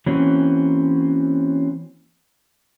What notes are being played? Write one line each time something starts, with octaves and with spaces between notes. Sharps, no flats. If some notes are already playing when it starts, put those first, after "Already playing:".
E3 A#3 C4 C#4 F#4